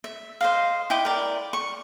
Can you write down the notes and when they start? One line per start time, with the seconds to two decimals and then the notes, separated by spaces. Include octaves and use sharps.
0.04 E5
0.41 C5 D#5 F5
0.90 E4 D#5 G5 D6
1.05 A#4 D5
1.53 C#6